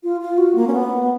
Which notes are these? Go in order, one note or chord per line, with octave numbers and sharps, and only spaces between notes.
F4
F4
F#4
A#3
C#4
B3